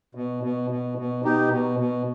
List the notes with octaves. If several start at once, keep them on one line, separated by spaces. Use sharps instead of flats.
B2
B2
B2
B2
B2 D#4 G4
B2
B2